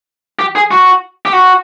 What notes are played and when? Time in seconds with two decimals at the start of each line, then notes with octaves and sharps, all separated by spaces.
0.39 G4
0.55 G#4
0.71 F#4
1.25 G4
1.33 F#4